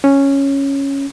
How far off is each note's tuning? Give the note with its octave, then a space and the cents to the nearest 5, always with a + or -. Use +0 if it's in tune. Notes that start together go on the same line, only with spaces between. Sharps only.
C#4 -5